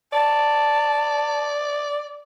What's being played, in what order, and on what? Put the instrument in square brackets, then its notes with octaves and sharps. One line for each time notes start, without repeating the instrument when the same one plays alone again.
[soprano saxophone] D5 [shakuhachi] A5